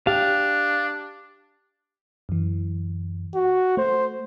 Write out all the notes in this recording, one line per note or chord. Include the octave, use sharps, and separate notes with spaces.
D4 G4 F5
F#2 E3
F#4
A3 C5